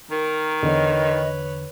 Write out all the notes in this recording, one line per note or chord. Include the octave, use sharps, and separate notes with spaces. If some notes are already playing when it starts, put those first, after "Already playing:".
D#3 A#4
E2 D3 B4 C#5 D#5